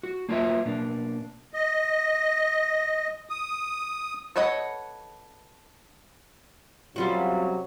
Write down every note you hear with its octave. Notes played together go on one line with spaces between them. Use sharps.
F#4
A#3 D4 F4 F#4 B4 E5
B2 A#3 D4
D#5
D#6
A4 B4 C#5 D#5 F#5
F#2 C3 F#3 G3 F4 F#4